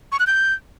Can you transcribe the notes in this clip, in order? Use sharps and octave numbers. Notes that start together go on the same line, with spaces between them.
C#6
F#6
G6